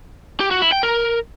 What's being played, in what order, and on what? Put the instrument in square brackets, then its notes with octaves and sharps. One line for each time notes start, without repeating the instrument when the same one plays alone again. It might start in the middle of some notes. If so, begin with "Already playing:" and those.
[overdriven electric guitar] G4
F#4
E4
G5
A#4